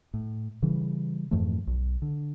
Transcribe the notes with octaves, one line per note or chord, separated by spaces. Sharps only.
A2
C#3 E3 G3
F2 G#2 E3 A3
B1
D3